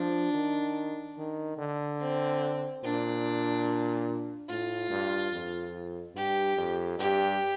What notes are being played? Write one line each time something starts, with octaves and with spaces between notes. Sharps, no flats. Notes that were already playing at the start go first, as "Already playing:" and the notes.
Already playing: F3 D4
D#3
D#3
D3
C4
A#2 D4
A2 F4
G2
F2
G2 G4
F2
G2 G4